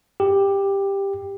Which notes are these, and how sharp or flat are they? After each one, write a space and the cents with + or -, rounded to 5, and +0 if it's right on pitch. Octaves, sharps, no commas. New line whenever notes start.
G4 +10